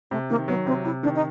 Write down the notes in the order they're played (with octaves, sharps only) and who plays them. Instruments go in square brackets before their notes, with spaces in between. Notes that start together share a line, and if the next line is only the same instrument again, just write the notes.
[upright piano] C3 [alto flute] A3
[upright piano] D#3 [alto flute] A#3
[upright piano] F#3 [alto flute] B3
[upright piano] C3 [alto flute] C4
[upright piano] C3 [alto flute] E4
[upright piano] D#3 [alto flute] D4
[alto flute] D#4